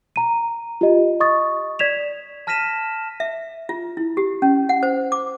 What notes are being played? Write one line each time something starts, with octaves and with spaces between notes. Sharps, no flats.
A#5 D#7
F4 G4 D#5
D#5 C#6 D#6 A6
D5 G#6 B6 E7 F7
A5 F6 A#6 B6 D#7 E7
E5
F4
E4
G4
C#4
F#5
C5
D6